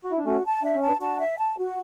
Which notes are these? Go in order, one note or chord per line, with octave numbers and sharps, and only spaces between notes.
F#4
E4
D4
A3 C#4 F#4
A5
D4 E5
C#4
A5
B3 D4
D4 F#4 A5
E5
A5
F#4